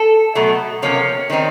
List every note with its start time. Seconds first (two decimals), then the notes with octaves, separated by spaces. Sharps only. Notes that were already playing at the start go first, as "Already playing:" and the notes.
Already playing: A4
0.35 B2 F#3 A3
0.82 C3 F3 A#3 C#4 C#5
1.30 D#3 G3 C4 D#4